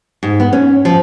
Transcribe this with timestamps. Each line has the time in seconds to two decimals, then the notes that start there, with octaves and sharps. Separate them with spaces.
0.23 G#2
0.40 B3
0.53 C#4
0.85 F3